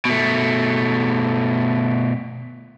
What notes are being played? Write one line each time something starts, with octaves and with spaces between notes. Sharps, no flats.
B2 A3